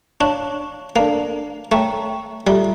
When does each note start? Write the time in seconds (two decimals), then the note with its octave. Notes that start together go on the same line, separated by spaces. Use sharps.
0.20 D4 C#5 F5 A5 C#6
0.96 A#3 D4 A4 D5 F5 A5
1.72 A3 C#5 G5 A#5 C#6
2.47 G3 F4 A4 E5 A#5